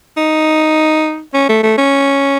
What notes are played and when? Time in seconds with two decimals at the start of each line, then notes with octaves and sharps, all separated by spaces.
0.17 D#4
1.34 C#4
1.49 A3
1.63 A3
1.78 C#4